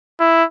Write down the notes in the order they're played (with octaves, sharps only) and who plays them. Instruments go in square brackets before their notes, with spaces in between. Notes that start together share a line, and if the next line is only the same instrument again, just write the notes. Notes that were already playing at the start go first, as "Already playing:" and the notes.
[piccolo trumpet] E4